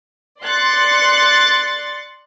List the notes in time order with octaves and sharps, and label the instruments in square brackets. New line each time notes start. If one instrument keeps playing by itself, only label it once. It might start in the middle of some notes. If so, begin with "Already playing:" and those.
[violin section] D5 C6 F#6 A6 C#7